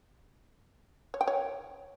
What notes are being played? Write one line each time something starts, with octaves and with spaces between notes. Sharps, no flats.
C#5
G5
C#5